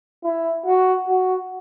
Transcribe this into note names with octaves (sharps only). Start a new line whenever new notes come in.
E4
F#4
F#4